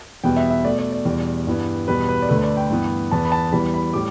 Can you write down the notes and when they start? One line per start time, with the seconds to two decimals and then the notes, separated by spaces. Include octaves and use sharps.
0.24 E2 B2 G3 B3 G5
0.36 E5
0.50 E5
0.65 B2 A3 D5
0.79 D5
0.92 D5
1.05 E2 B2 G3
1.47 G2 E3 G3 B3
1.88 E2 B2 G3 B3 B4
2.09 B4
2.22 D5
2.29 D2 D3 A3 B4
2.39 B4
2.44 D5
2.57 G5
2.70 G2 E3 B3
3.11 E2 E3 B3 A5
3.25 B5
3.32 A5
3.52 E2 E3 G3 B3 B5
3.74 B5
3.93 A2 G3 D6